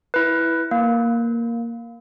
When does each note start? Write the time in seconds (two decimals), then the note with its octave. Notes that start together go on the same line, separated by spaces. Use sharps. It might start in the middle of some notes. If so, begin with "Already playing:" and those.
0.14 E4 B4
0.71 A#3